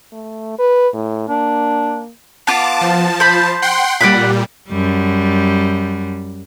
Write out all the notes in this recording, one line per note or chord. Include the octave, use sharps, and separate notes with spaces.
A3
B4
A2
A#3 D4
B3 F4 A5 D6
F3 A5
C5 B5
F#5 G5 C6
A#2 G3 D5 F#5 B5
F#2 G3